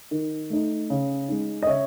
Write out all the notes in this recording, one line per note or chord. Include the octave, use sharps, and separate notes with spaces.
D#3
A3 D#4
C#3
G#3 D#4
D#5
C#3 C#5 E5